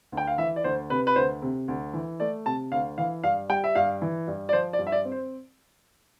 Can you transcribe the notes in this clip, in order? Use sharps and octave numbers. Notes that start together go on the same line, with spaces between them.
D2
G5
F5
E3 E5
D5
D2 C5
C3 B4
B4
D2 C5
C3
D2
E3
A3 D5
C3 A5
D2 F5
E3 F5
G2 F5
G3 G5
E5
G2 F5
E3
G2
D5
F3 C5
D5
G2
E5
D5
C4
C5